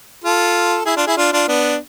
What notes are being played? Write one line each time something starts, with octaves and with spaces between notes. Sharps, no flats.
F4 A4
E4 G#4
D4 F4
E4 G#4
D4 F4
D4 F4
B3 D4